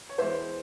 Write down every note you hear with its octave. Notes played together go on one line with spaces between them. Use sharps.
C#5
E2 E3 G#3 C5 E5